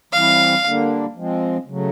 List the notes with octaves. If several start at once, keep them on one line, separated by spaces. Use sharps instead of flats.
E3 G3 C4 E4 F5
D3 G3 A#3 D4
F3 G#3 C4
C#3 F#3 A3